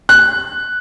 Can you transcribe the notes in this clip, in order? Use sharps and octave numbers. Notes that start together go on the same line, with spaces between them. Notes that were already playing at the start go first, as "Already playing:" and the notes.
F#6